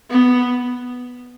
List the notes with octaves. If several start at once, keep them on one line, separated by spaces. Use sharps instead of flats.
B3